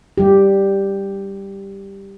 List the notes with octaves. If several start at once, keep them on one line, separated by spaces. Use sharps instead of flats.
G3 G4